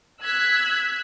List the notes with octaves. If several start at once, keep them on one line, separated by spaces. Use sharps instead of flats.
E6 F#6 G#6 B6